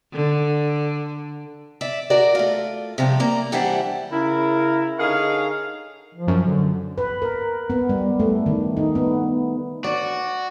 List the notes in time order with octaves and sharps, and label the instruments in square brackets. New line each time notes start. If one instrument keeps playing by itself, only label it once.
[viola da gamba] D3
[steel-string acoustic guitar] D5 E5
F#4 A#4 D5
A3 F4
C3 F3 G3
A#3 D5 A#5
E3 G3 D4 C5 E5 F#5
[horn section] C#3 E4 A#4
D3 D#4 G#4 A#4 C#5 F5
[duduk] F3
[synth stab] F#2
[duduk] D3
[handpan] B4
A#4
B3
G3
A3
D#3
D#4
B3
[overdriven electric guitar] F#4 [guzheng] D5